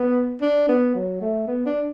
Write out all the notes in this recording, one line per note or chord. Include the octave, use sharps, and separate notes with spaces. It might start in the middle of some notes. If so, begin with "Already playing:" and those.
Already playing: B3
D4
B3
F#3
A3
B3
D4